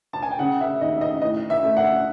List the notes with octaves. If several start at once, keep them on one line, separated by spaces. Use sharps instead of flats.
A5
G#5
G5
C#3 F#5
E5
D#2 D#5
D#5
A2 D#5
E5
A3
F#5